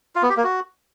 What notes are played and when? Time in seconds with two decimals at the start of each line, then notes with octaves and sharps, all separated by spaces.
0.15 F4
0.23 B3
0.30 G4
0.37 A#3
0.44 F#4